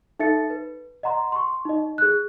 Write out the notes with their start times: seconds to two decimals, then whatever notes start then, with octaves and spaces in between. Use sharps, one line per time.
0.19 D#4 A4 E5 A6 C#7
0.50 B4
1.03 D#5 F#5 A#5 C6
1.32 C6 C#6
1.65 D#4 D#5
1.98 G#4 F#6